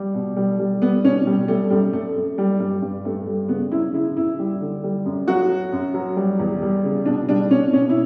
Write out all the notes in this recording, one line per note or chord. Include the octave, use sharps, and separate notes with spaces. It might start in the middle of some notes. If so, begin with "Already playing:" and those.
Already playing: G3
B2
G3
G3
G3 B3
B2 C#4
B2 G3
G3 A3
F#2 G3
F#2 A3
F#2
G3
G2 G3
G2
G2 A3
G3
C#3 B3
F#2 E4
C#3 E4
F#2 E4
G3
D3
G3
F#2
F#3 F#4
F#3
F#2
F#3
G3
E2
G3
C#3
B2 D4
G3 D4
B2 C#4
B2 C#4
E4